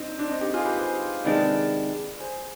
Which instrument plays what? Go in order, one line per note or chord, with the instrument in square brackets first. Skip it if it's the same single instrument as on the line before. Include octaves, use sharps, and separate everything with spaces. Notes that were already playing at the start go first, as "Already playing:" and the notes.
Already playing: [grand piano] C4 D4 D#4
D4
C4 D#4
D#4 G4
F4 G#4
G4 B4
G#4 C5
[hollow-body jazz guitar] C3 D#3 G#3 D4 [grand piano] B4 D5
[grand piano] G#4 C5